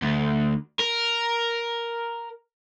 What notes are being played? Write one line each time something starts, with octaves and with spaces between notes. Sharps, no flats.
D2
A#4